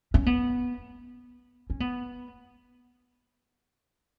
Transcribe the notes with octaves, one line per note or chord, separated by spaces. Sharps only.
C#4
B3
C#4
B3